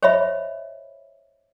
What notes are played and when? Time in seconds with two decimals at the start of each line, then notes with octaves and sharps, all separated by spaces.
0.03 C5 C#5 D#5 E5 B5